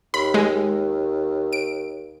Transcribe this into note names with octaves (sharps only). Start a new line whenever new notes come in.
D#2 B5
G#3
D7